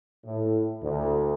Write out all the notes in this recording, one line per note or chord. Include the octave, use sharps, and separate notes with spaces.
A2
D2